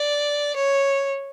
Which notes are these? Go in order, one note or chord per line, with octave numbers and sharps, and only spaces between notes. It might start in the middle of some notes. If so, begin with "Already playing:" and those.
Already playing: D5
C#5